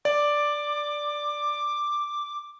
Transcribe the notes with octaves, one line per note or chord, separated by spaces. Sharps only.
D5 D6